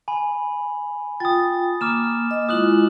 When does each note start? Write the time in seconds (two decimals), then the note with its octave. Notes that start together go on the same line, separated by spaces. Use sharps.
0.08 G#5 B5
1.20 F4 G5 D#6 A6
1.81 A#3 D6 F6 E7
2.31 D#5
2.49 G#3 E4 F4 D#6 F#6 F#7